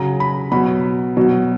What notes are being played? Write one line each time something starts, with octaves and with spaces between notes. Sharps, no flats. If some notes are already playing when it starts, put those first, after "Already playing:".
Already playing: C#3 F#3 A#5
B5
B2 F#3 B5
B2 F#3